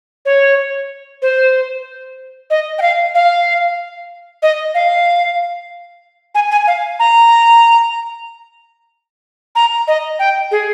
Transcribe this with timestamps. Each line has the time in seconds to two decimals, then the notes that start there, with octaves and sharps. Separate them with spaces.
0.25 C#5
1.22 C5
2.50 D#5
2.79 G5
2.82 F5
3.15 F5
4.43 D#5
4.75 F5
6.35 G#5
6.51 G#5
6.67 F5
6.99 A#5
9.55 A#5
9.88 D#5
10.19 G5
10.51 G#4